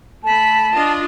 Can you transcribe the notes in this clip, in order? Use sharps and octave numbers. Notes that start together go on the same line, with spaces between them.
A3 A5 B5
D4 F4 D#5